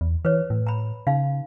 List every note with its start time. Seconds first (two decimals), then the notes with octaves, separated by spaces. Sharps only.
0.01 E2
0.25 E3 B4 C#5
0.50 A2
0.67 A#5 B5
1.07 C#3 D#4 F5